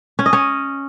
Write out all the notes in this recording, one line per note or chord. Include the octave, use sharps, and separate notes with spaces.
C#4
D#5
C#4